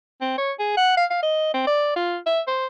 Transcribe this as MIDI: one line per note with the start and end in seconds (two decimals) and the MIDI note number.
0.21 0.36 60
0.38 0.52 73
0.59 0.72 68
0.77 0.96 78
0.97 1.05 77
1.11 1.19 77
1.23 1.54 75
1.54 1.65 60
1.67 1.93 74
1.96 2.17 65
2.26 2.41 76
2.47 2.66 72